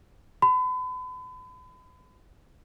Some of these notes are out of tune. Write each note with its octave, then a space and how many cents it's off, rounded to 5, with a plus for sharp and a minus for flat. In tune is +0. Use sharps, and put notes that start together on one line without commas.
B5 +40